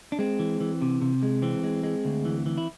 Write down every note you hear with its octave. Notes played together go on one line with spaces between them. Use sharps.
D4
G#3 C4
E3
E3
C3
C3
G#3
E3 C4
G#3
G#3
D2
E3
E3
E4